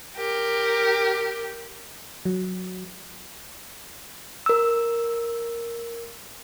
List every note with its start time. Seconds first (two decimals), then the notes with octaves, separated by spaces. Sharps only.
0.16 G4 A#4
2.25 F#3
4.46 A#4 E6